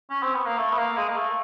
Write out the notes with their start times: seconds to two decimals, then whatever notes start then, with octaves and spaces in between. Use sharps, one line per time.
0.10 C#4
0.23 C4
0.35 B3
0.46 A#3
0.58 A3
0.72 B3
0.78 A#3
0.97 G#3
1.08 A#3
1.17 A3